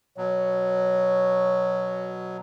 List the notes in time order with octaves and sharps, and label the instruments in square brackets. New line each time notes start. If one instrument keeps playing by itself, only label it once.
[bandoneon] B2 F#3 [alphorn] C#5